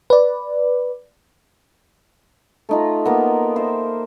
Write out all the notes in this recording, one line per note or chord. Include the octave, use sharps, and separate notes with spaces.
B4 D5
A3 D#4 F4
A#3 B3
C5 E5